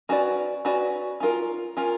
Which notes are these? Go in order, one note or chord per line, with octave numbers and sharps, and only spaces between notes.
C#4 F#4 B4 D5
C#4 F#4 B4 D5
C#4 F4 A#4
C#4 F4 A#4